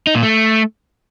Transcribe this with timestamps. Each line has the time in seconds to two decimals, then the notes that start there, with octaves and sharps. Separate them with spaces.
0.07 D#4
0.15 A#2
0.23 A3